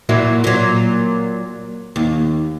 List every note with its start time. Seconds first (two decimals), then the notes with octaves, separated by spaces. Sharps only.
0.09 A#2 F#3 E4
0.44 A#2 F#3
1.96 D#2